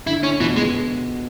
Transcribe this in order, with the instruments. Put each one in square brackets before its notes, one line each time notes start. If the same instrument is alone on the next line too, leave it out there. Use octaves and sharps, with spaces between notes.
[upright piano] D3 [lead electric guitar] E4
[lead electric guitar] C#4
[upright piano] B2 [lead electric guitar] E3
[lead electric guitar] G#3